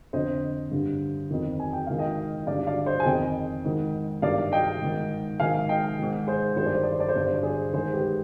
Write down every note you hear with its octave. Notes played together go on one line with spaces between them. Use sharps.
F2 D3 C5 D#5
G2 D3
F2 D#3
G#5
G5
G#2 D#3 F5
D#5 G5
G2 D3 D5 F5
D5 F5
C5 D#5
G#5
F2 D#3 D#5 G5
G#2 D#3
G2 D#3 D5 F5
D#5 G5
G#2 D#3
G#2 D#3 F5 G#5
D#5 G5
G#2 D#3
G#4 C5
G2 D#3 C5
D5
C5
D5
C5
D5
C5
G2 D3 D5
C5
D5
G#4 C5
G#2 D#3 G#4 C5
G4 B4